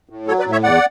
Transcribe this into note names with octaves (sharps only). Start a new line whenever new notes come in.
A2
F#3 A4 C#5
B4 D5
A2
C#5 E5
E2 D5 F#5